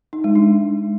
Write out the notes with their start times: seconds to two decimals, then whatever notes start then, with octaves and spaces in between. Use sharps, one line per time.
0.13 D#4
0.24 G#3
0.35 D4